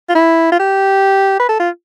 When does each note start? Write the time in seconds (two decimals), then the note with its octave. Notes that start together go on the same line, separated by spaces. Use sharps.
0.09 F4
0.15 E4
0.52 F4
0.59 G4
1.40 B4
1.49 A4
1.60 F4